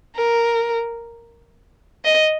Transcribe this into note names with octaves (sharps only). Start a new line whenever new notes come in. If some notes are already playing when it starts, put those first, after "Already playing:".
A#4
D#5